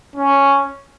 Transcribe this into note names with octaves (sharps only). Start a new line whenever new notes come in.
C#4